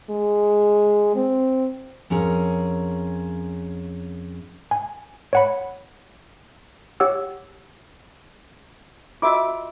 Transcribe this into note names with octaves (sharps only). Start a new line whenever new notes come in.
G#3
C4
F2 C#4 G#4 A#4
G#5
C#5 F#5 B5
G4 C#5 F#5 E6
F4 F#4 D#5 E5 D6